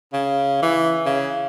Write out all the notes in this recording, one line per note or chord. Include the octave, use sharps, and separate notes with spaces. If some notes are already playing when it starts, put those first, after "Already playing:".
C#3
E3
C#3